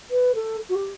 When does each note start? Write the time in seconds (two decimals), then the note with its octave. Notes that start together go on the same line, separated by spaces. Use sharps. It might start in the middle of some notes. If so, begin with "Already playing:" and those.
0.10 B4
0.34 A4
0.69 F#4
0.75 G4